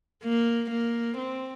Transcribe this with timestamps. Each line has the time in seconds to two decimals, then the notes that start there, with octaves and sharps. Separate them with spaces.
0.23 A#3
0.71 A#3
1.17 C4